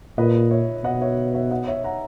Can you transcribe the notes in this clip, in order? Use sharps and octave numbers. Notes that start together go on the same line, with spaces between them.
A#2 B4 D#5
C#5 E5
B2 D#5 F#5
C#5 E5
C#5 E5
D#5 F#5
C#5 E5
F#5 A#5